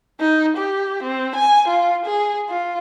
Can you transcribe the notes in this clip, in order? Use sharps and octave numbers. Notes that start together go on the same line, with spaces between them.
D#4
G4
C4
G#5
F4
G#4
F4